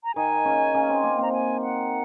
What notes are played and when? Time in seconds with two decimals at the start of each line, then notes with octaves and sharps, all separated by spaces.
0.04 A#5
0.15 D#3 D#4 G#5
0.45 C#3 C#4
0.74 C#3 C#4
0.89 C4
1.03 A#3
1.19 C4 A#5
1.33 G#5
1.62 F#5